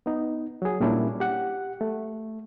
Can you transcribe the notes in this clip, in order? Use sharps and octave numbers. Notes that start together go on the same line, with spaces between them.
B3 D#4
F#3 G#4
A#2 G3 A#3 C#4 D4 E4
G4 F#5
A3